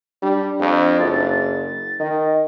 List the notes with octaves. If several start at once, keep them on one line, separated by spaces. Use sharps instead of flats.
G3 D4
F2
F#1 A6
D#3 D#5